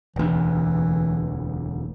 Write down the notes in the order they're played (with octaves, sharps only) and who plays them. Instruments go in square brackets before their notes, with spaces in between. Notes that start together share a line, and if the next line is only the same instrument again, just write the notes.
[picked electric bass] E1 D2 [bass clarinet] E3